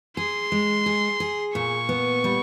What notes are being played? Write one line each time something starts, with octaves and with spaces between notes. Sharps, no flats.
G#4 C6
G#3
G#4
G#4
A#2 C#6
B3
G3